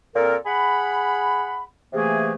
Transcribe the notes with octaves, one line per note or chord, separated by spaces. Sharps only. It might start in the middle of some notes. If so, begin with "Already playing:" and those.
A#2 C4 A4 A#4
G#4 F#5 B5
C3 E3 A3 A#3 G#4